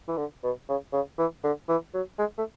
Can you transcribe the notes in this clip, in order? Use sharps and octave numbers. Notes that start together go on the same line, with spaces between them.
E3
D3
B2
C#3
C#3
E3
D3
E3
F#3
G#3
A3